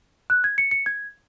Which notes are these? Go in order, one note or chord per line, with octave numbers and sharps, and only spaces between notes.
F#6
G#6
C#7
C#7
G#6